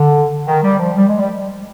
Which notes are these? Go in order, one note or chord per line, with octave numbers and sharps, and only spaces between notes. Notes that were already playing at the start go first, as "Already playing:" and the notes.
Already playing: D3
D#3
G3
F3
G3
G#3
G3